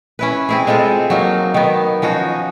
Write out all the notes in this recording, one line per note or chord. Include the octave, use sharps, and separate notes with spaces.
C#4 E4 B4
C4 E4 G#4
G#3 C4 F4 A4
F#3 A#3 D#4
D#3 B3
F3 C#4 D#4 F#4